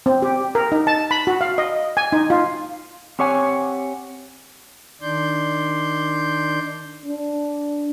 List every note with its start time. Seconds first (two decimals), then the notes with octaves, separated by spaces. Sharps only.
0.06 C4
0.22 G4
0.55 A#4
0.72 D#4
0.87 A5
1.11 B5
1.27 F#4
1.41 F5
1.58 D#5
1.97 G#5
2.12 D#4
2.30 F4
3.19 C4 G4 C#5 F#5 G#5
5.02 D#3 D4 D5 C6 G6
7.05 D4